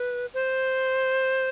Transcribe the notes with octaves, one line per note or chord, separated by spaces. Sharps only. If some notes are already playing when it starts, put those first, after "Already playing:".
Already playing: B4
C5